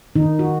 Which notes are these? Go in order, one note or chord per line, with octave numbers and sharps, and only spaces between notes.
D#3 D#4
F#4